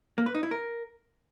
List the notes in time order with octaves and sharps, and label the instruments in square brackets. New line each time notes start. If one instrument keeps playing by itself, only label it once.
[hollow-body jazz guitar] A#3
B4
D#4
E4
A#4